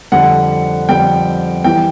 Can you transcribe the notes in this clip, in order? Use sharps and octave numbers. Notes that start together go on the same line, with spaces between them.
F2 D3 G3 F#5
F2 D3 G3 G5
E3 G3 G5